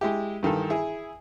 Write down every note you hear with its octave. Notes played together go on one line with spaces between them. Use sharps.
G#3 E4 G4
G2 D#3 E3 A4
E4 G#4